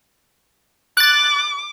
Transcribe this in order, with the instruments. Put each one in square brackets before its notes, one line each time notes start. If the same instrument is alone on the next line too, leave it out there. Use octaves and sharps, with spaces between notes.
[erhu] D6 [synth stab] F#6 A6